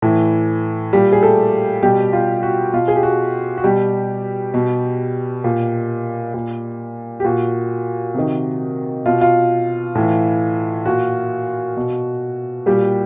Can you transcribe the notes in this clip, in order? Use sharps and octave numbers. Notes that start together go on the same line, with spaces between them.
A2 E3
A#2 G3 G4
G#4
A3 A4
B2 G3 G4
F4
F#4
B2 F4
G#4
G4
F#4
F#4
B2 G3 G4
B2
A#2
A#2
G4
A#2 F#4
C3 D#3
B2 F4
F4
A2 E3
A#2 F#4
B2
A#2 G3 G4